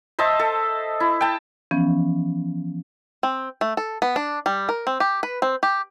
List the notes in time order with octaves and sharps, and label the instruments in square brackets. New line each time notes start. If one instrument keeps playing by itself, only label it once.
[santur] C5 D#5 E5 A5
A4
E4
G5 A5
[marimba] E3 F3 B3 C#4
[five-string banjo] C4
A3
A4
B3
D4
G3
A#4
C4
G4
B4
C4
G4